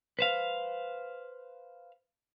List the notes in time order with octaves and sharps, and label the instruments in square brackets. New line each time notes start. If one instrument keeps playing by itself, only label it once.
[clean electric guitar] B4 C5 F5